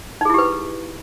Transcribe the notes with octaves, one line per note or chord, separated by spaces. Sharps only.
D#4 E4 G4 G#4 B4